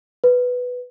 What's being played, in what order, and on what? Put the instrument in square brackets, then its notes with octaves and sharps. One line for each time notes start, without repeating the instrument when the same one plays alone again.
[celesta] B4